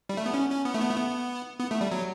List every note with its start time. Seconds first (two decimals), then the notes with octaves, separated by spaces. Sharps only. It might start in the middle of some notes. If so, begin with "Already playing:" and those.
0.09 G3
0.17 A3
0.26 B3
0.34 C#4
0.50 C#4
0.65 B3
0.74 A3
0.81 B3
0.90 A3
0.97 B3
1.60 B3
1.71 A3
1.81 G3
1.91 F#3